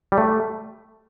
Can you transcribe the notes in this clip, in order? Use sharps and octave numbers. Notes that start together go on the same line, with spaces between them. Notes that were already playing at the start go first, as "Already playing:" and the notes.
G3
A3